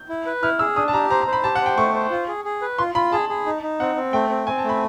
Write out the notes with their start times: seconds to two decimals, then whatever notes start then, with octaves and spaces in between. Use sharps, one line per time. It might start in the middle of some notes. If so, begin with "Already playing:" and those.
Already playing: G6
0.09 E4
0.26 B4
0.42 E4 F6
0.59 G#4 E6
0.76 D4 D#6
0.88 A5
0.93 G4 A#5
1.10 C5 A#5
1.21 A#5
1.27 C5
1.33 B5
1.44 G4 A5
1.55 F#5
1.61 C5 G5
1.77 A3 C#6
1.94 C5
2.11 F4
2.28 G#4
2.45 G#4
2.62 B4
2.78 F4 C6
2.95 F4 B5
3.12 G#4 A5
3.29 G#4
3.46 D#4
3.63 D#4
3.80 C4 F#5
3.96 C4
4.13 A3 G5
4.29 C4
4.47 C4 G#5
4.58 A5
4.64 A3 B5